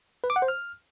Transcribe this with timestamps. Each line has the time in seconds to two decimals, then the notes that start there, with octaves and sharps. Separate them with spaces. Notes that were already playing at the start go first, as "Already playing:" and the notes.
0.24 B4
0.30 D6
0.36 F#5
0.42 C5
0.48 F6